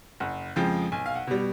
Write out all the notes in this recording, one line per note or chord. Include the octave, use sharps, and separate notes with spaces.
F#1 F#5
F2 C#3 F3 G#3 G5
B1 G#5
F5
F#5
B2 G3